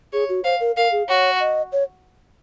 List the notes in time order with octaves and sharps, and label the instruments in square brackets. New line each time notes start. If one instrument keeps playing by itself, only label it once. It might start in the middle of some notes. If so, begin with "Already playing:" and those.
[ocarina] G#4 [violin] C#5
[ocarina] F#4
[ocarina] C5 [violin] F5
[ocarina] A#4
[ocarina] A#4 [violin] F5
[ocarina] G#4
[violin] F#4 [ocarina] C#5
[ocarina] D#5
C#5